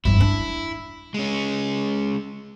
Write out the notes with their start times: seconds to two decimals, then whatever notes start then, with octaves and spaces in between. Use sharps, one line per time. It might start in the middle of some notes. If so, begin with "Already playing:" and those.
0.05 G1 F2 E4
0.21 D4
1.14 G#3 C#4